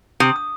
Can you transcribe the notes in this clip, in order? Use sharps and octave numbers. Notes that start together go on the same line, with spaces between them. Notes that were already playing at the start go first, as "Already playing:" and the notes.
C3 D#6
D#6